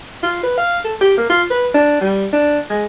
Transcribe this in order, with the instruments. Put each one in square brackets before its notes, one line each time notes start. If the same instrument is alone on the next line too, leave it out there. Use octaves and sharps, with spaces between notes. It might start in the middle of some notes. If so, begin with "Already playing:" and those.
[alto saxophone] F4
B4
F5
A4
G4
A#3
F4
B4
D4
G3
D4
G#3